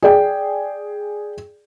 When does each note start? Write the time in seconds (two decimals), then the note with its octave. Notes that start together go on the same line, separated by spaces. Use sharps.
0.03 G#4 D5 G5